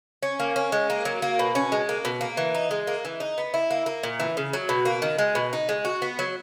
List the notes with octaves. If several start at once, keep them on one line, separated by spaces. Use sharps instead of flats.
C#4
A#3
C#4
G#3
A#3
F#3
A#3
B2
C#4
G#3
A#3
B2
A#3
E3
D#4
G#3
A#3
E3
D#4
B3
E4
A#3
A#3
A#2
E3
C#3
F#3
B2
A#3
D#3
G#3
B2
D#4
G#3
F#4
B3
F#3